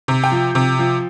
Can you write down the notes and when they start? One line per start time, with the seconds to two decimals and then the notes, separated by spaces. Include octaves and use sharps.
0.08 C3
0.24 G5
0.32 F3
0.55 C3
0.79 F3